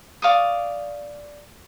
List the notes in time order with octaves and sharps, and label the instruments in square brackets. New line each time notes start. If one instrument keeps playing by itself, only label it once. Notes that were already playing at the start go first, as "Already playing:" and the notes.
[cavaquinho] D5 F5 C#6 D#6